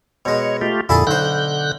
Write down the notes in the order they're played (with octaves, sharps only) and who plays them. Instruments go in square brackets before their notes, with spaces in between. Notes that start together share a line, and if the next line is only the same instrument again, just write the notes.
[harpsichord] B2 G#3 [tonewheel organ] C#5
[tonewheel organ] A3 F4 G4
[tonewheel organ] F2 A#2 D3 [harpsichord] E4 G#4 A4
[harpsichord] B1 C5 [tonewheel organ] D3 F#6 G6